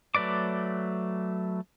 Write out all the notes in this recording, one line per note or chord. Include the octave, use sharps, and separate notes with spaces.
F#3 A3 B4 D5 D6